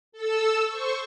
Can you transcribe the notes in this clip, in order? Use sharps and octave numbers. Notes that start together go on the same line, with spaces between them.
A4 E6
C5 C#6